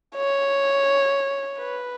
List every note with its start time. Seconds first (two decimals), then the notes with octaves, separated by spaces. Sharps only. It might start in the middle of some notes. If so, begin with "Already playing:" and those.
0.16 C#5
1.59 B4